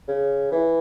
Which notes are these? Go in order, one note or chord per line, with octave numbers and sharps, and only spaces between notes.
C#3
E3